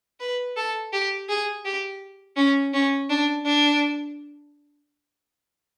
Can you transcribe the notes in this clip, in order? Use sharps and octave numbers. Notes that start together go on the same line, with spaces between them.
B4
A4
G4
G#4
G4
C#4
C#4
D4
D4